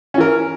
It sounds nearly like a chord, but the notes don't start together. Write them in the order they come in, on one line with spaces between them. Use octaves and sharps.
C#4 E3 A#4